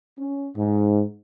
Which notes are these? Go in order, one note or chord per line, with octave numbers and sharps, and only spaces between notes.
C#4
G#2